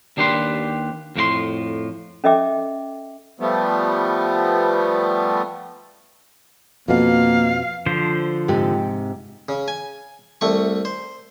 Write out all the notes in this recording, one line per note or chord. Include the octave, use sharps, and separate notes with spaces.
D#2 D4 G4 B4 C6
F2 A2 F#4 C6
C#4 A4 D#5 E5 G5 D6
F3 G3 A3 B3
F2 B2 A#3 F5
D3 F3 C5
G#2 C3 G4
C#3
G#5
C2 A3 C#6
C5